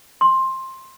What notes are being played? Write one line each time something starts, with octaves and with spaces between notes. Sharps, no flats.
C6